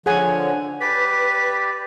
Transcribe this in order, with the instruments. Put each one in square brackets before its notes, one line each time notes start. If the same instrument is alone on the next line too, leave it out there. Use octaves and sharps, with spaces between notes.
[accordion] D3 F3 [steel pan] G#4 F#5 G#5 [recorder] C#5
[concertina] G4 D5 [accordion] B4 [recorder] B6